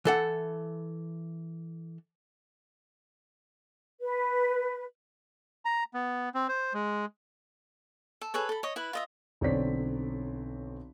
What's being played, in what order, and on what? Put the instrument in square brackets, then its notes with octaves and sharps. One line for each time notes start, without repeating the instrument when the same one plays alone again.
[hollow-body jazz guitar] E3 A4 F#5
[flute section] B4
[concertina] A#5
B3
C4
C5
G#3
[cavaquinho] A4
G#4 A4 B4 C#5
A4 B5
C#5 D#5
E4 B4
F4 D#5 E5
[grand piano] B1 D3 C4 C#5 D5 B6